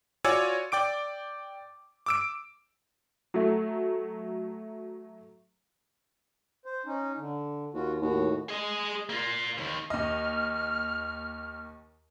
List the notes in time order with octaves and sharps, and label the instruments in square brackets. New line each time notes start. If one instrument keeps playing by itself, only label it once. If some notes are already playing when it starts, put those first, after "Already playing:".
[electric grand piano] F4 F#4 C#5 D5 G#5 E6
D5 G5 D6 D7
D6 E6 D7
[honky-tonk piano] F#3 A3
[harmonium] C5
C#4 D#4
D3
[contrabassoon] D#2 [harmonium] F4 F#4
[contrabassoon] D#2 [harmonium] A2 F#4
[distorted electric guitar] G#4 D#5
A#3 F4
D#2 D#3
[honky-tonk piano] D#2 D#5 [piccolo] F6